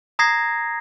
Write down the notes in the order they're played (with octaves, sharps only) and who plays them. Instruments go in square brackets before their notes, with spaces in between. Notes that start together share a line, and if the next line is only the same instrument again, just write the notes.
[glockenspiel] A#5 D#6 G#6 A#6 C7